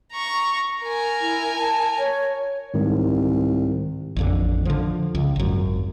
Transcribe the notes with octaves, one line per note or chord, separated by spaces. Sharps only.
A#5 C#6
A#4 G#5
E4
A5
C#5
C2 G#2 D#3 G#3
A1 F2 D3
D3 F3
C#2
G#1 F#2